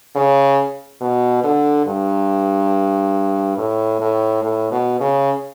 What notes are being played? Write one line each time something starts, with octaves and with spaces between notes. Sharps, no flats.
C#3
B2
D3
G2
A2
A2
A2
B2
C#3